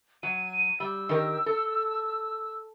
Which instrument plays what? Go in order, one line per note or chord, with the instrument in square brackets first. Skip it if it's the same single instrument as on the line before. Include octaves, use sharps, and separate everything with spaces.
[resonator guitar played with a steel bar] F#3 [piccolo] D#7
[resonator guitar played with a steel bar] G3 [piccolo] E6
[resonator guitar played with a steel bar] D#3 G4 A#4
A4